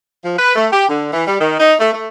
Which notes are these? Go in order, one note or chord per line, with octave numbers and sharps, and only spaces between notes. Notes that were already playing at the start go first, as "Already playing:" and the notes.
F3
B4
A3
G4
D3
E3
G3
D#3
D#4
A3
A3